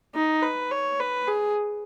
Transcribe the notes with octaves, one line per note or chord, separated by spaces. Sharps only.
D#4
B4
C#5
B4
G#4